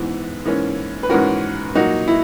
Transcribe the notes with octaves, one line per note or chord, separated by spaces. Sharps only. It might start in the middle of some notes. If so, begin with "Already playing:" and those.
Already playing: G#2 E3 B3
G#2 E3 A#3 C#4
B4
G#2 E3 A#3 C#4 F#4 A#4
A#2 F#3 A#3 D#4 F#4
E4